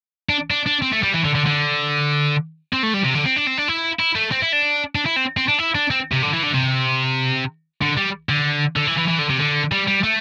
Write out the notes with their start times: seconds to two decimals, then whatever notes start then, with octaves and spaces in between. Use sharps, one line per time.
0.29 D4
0.51 D4
0.66 D4
0.82 C4
0.92 A3
1.03 G3
1.14 E3
1.25 D3
1.35 D3
1.46 D3
2.73 C4
2.83 A3
2.94 G3
3.04 C3
3.15 D3
3.26 C4
3.37 D4
3.47 C4
3.58 D4
3.68 E4
4.00 E4
4.16 A3
4.32 C4
4.42 E4
4.53 D4
4.95 D4
5.06 E4
5.16 C4
5.37 C4
5.48 D4
5.59 E4
5.75 D4
5.91 C4
6.12 C3
6.22 D3
6.33 E3
6.43 D3
6.54 C3
7.82 D3
7.97 G3
8.29 D3
8.76 D3
8.87 E3
8.97 E3
9.08 E3
9.19 D3
9.30 C3
9.40 D3
9.72 G3
9.87 G3
10.03 A3